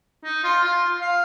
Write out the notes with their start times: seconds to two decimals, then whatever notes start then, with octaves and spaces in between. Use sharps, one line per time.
0.24 D#4
0.44 F4
0.63 F4
1.01 F5